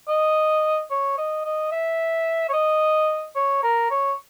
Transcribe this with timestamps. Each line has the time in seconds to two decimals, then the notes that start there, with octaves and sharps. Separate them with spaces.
0.08 D#5
0.90 C#5
1.18 D#5
1.45 D#5
1.72 E5
2.49 C#5
2.53 D#5
3.35 C#5
3.63 A#4
3.91 C#5